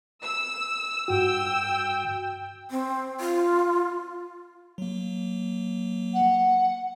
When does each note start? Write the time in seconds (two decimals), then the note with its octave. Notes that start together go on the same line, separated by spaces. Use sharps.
0.22 E6
1.08 G2 F#4 G5 E6
2.71 C4
3.20 F4
4.78 F#3 A#3
6.14 F#5